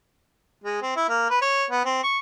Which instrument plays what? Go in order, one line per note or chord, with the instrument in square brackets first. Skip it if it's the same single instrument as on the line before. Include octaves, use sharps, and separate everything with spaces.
[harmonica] G#3
C4
E4
A#3
B4
C#5
B3
C4
C#6